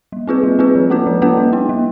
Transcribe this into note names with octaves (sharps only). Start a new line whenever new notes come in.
G3
C4 F4 G#4 B4
G3
C4 F4 G#4 B4
F3
A#3 C#4 F#4 B4
F3
A#3 C#4 F#4 B4
G3
B3 E4
G3